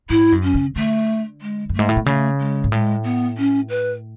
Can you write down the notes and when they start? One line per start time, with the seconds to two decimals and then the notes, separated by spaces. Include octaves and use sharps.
0.10 G#2 E4
0.32 F#2
0.43 C#4
0.54 C#3
0.76 D3 A3
1.42 G#3
1.69 F#2
1.74 G#2 A3
1.89 A2
1.97 B2
2.06 C#3 A3
2.39 G#3
2.64 G#2
2.72 A2 G#3
3.04 B3
3.38 C#4
3.69 B4